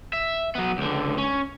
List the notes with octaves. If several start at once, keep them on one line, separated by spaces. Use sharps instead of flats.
E5
F#3 B3
C#2 D3
C#4